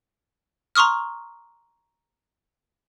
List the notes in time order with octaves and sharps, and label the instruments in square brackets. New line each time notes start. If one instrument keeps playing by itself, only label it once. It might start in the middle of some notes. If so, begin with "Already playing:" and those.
[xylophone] A#5 C6 C#6 D#6 F6